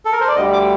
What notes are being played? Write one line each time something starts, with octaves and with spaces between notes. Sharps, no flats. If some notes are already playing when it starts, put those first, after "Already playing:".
A4
A#4
C5
D5
D2 D3 G3 D#5
D6